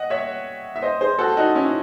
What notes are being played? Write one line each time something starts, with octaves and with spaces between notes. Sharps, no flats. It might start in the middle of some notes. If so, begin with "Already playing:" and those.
Already playing: D#5 F#5
C#5 E5
E5
C5 D#5
G#4 C5
F#4 A4
D#4 F#4
C#4 E4